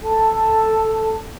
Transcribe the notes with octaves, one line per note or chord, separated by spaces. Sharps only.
A4 A5